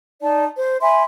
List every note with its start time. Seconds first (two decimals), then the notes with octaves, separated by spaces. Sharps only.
0.22 D#4 D5 A5
0.56 C5
0.82 E5 G#5 B5 C6